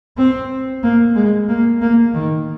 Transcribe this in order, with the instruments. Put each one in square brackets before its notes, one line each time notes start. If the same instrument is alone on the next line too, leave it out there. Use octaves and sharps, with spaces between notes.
[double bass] C4
A#3
G#3
A#3
A#3
D#3